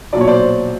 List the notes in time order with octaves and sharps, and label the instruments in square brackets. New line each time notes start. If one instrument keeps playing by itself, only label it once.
[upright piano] B1 A#2 F#3 D5
C#5
C5 D5